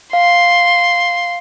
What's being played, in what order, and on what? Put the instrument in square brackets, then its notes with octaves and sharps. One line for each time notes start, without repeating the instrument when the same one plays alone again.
[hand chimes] F5 [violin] C6